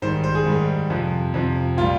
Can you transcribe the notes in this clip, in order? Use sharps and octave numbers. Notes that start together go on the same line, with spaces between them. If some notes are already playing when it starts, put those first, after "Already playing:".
G#2 D#3 G3 C5
C5
G#4
G#2 D#3 G3
F2 C3 F3
F2 C3 F3
A#2 G3 F4